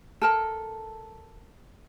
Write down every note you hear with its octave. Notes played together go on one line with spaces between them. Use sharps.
A4 A#4 A5